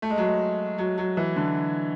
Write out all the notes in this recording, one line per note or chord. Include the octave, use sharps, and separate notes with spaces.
A3
G#3
F#3
G#3
F#3
F#3
E3
D3